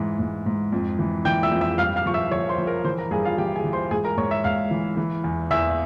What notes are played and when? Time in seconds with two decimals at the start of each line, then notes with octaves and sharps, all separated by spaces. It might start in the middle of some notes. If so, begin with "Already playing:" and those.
Already playing: G#2 E3
0.19 G#2
0.46 G#2
0.72 F2
0.99 E3
1.25 E3 G5 G6
1.43 E5 E6
1.52 F2
1.61 E5 E6
1.78 G2 F5 F6
1.96 F5 F6
2.06 F3 C#6
2.14 E5 E6
2.31 F3 C#5 C#6
2.49 C5 C6
2.58 F3
2.67 A#4 A#5
2.85 E3 C5 C6
2.98 A#4 A#5
3.11 G2 G#4 G#5
3.25 F4 F5
3.38 E3 G4 G5
3.56 G#4 G#5
3.64 E3
3.73 C5 C6
3.91 G#2 G#4 G#5
4.05 A#4 A#5
4.17 G#2 C#5 C#6
4.31 E5 E6
4.44 G#2 F5 F6
4.71 E3
4.97 E3
5.24 E2
5.51 E2 E5 E6